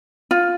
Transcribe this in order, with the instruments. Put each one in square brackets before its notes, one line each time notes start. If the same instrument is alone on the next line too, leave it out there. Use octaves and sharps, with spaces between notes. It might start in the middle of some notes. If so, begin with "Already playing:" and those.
[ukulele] F4